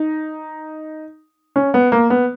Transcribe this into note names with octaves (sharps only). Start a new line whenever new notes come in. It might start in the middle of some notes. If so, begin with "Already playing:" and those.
Already playing: D#4
C#4
B3
A#3
B3